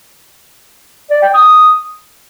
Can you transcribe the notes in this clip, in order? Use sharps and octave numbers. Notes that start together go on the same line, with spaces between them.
D5
G5
D#6